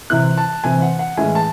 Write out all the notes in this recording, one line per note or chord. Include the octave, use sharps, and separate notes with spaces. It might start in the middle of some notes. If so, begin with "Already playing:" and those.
C3 E3 C4 E4 F#6
A5
C3 E3 C4 E4 G#5
F#5
F#5
A2 E3 G#3 C#4 E4 G#5
A5